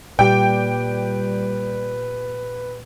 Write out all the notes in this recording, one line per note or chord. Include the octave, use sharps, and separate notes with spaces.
A#2 G3 G4 B4 D5 G5